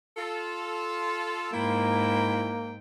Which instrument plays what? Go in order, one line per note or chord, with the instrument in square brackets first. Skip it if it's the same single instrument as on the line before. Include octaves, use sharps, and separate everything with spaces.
[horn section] F4 A4
[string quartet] G#2 G5 [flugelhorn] A#3 [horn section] E4 F4 B5